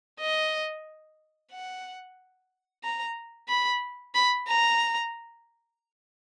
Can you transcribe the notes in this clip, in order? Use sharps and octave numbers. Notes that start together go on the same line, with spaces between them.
D#5
F#5
A#5
B5
B5
A#5